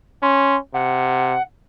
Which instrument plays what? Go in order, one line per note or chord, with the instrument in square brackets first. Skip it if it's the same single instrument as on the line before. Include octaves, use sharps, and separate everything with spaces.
[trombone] C#4 [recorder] C6
[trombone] C3 [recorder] F#5